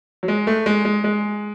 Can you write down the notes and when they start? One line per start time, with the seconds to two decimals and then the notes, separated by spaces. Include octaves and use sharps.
0.23 F#3
0.28 G#3
0.47 A3
0.66 G#3
0.85 G#3
1.04 G#3